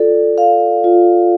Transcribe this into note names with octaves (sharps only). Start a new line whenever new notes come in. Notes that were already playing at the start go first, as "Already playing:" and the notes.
Already playing: F4 A4 D5
F5
F4